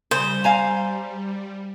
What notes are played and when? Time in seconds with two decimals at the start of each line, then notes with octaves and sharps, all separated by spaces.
0.11 C#3 G3 C5
0.44 F5 G#5 A#5